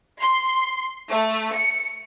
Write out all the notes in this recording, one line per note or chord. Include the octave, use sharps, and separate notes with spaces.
C6
A3
C#7